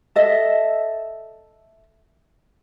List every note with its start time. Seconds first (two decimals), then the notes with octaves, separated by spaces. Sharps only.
0.16 A4 D#5 E5